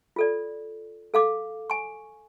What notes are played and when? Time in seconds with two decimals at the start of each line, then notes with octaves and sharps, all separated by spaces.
0.16 F4 A4 D5
1.14 A4 F5 D6
1.70 G#5 C#6